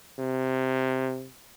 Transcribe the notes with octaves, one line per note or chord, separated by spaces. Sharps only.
C3